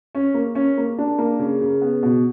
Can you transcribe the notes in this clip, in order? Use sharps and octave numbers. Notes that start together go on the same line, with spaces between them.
C#4
A#3
C#4
A#3
D4
A#3
C#3
C#3
B3
B2